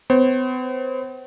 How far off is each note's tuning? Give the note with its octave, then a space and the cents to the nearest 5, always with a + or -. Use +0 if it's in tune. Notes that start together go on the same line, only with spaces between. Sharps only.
B3 +45 C5 +40